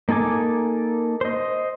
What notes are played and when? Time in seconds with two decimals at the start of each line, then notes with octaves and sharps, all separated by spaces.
0.09 A#3 D#4 A4 G#5 D6
1.21 C5 D#5